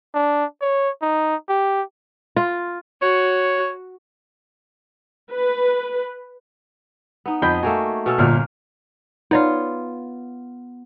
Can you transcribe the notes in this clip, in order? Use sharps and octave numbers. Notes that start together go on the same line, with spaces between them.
D4
C#5
D#4
G4
F4
F#4 C#5
B4
B3 D#4
F2 D#5 G5 B5 G6
A3 A#3 F#4 G#5
B2 C#4 A4
G1 A#2 A#3 F6
B3 D#4 F4 C#5 D5